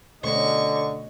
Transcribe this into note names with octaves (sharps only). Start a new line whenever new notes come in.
B2 D3 A3 C#4 D#5 C#6